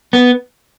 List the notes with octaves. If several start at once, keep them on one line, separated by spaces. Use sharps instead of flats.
B3